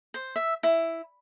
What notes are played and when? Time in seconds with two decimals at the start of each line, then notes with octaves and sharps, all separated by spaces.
0.14 C5
0.36 E5
0.63 E4